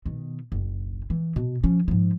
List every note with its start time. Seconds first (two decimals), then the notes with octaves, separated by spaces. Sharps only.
0.05 B2 D#3
0.52 F#1 B1
1.10 E3
1.36 B2
1.64 F3 C#4
1.88 G#2 F3